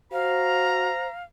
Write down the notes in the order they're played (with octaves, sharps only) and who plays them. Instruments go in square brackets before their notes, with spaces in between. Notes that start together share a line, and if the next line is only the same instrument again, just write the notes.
[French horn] F#4 [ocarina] C5 [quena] F5 [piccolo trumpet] A#5